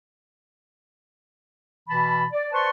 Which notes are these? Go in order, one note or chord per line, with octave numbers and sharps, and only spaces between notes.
B2 E3 A5 B5
D5
B4 C5 D5 A5 C6 C#6